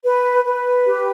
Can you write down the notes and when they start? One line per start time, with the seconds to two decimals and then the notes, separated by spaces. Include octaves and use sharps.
0.03 B4
0.45 B4
0.86 G4